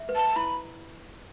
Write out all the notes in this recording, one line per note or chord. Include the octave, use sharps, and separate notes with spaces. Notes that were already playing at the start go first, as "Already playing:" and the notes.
Already playing: E5
B4
A5
E4 B5